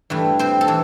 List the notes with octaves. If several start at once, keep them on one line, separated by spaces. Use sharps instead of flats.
G2 E3 A3
C4 C5
A4
E3